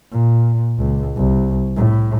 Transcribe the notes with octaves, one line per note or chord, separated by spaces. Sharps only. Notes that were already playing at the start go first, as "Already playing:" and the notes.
A#2
C#2
C2
A2